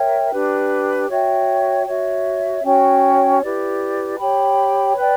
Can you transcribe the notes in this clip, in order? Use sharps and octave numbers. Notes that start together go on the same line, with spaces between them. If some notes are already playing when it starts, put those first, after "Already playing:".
Already playing: A#4 C#5 E5 G5
D4 G4 B4
F#4 C#5 E5 G5
F#4 C#5 E5
C#4 F#4 C#5 G5
E4 G4 B4 D5
G4 C#5 G5 B5
B4 D5 G5